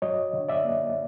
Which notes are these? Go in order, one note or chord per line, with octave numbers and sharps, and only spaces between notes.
F#3 C#5 D#5
D3
D5 E5
A#3